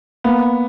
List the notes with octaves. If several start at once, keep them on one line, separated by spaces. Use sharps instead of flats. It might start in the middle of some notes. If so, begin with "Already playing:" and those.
A#3 B3